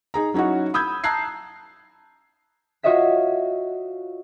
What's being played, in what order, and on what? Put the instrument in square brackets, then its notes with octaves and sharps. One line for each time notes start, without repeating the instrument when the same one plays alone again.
[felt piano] D#4 G#4 A#5
F#3 C#4 D#4 E4 F#4
B5 D#6 E6 G6 G#6
A5 A#5 E6 F#6 G#6 C7
[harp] F4 F#4 C#5 D#5 E5 B6